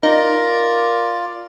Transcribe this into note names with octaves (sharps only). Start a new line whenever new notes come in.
D#4 F4 A#4 D5